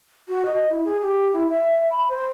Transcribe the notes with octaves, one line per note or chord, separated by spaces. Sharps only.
F#4
D#5
E4
G#4
G4
E4
E5
B5
C5